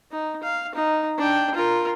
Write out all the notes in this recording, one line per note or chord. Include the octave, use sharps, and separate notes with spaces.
D#4
F5
D#4
D4 G5
F4 A#4